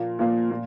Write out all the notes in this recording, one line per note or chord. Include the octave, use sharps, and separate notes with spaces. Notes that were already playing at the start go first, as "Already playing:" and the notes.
Already playing: A#2 F3 A#3
A#2 F3 A#3
A#2